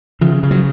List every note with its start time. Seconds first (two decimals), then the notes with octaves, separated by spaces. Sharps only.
0.21 C#3 F3
0.43 C#3
0.51 F#3